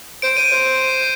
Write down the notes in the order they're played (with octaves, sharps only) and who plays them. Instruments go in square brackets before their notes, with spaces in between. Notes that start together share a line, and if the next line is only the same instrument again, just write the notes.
[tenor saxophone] C5 [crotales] D7
[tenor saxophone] C5 [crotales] D#7
[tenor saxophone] C5